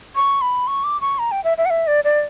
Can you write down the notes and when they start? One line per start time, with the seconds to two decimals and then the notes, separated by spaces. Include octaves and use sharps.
0.15 C#6
0.41 B5
0.67 C#6
0.84 D6
1.01 C#6
1.19 A#5
1.32 G5
1.44 E5
1.58 E5
1.65 F#5
1.70 E5
1.87 D5
2.05 D5